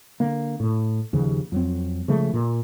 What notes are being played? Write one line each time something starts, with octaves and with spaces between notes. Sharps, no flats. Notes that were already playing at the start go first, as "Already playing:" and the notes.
D3 A#3
A2
D#2 C#3 F3
F2 F#3 C4
C#3 F3 G#3 A3
A#2